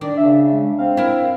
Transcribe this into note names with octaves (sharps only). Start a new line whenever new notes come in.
D#3 D4 D5
C#3 E5
G#3
C4 F5
E4 A#4